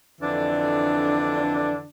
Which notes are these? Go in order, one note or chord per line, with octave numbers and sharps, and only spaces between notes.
F2 D3 E3 D4